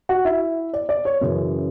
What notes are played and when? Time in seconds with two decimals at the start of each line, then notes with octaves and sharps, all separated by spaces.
0.09 F#4 F#5
0.25 E4 E5
0.73 D5
0.89 D5
1.05 C#5
1.21 F#2 C#3 E3